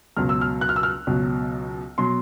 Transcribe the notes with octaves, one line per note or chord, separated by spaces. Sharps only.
C#2 B2 F#3 F6
E6
F6
F#6
F6
E6
F6
C#2 B2 F#3
B2 F#3 C6